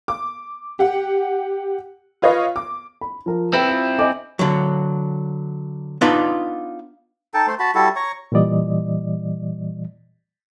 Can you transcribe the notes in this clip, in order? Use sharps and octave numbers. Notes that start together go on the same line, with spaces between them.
D6
G4 F#5
F4 B4 C#5 D#5 F5
D6
B5
F3 A#4
C4 E4 B4 G5
F4
D#5 G#5 D6
D3 F#3
B3 D4 D#4 F4 B4 D5
D#4 A4 G5 A5
A3 C5
F#4 A5 B5
G3 E4 F#4 A4
C#5 A#5 C#6
A#2 E3 G3 D5 D#5